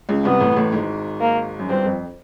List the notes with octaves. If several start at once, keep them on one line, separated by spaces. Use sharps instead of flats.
C#2 C#3
C2 C3 B3
A1 A2
A1 A2
G#1 G#2
A#3
F#2
G1 G2 C4
F2